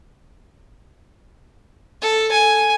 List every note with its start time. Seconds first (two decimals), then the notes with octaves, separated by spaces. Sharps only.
2.02 A4
2.32 G#5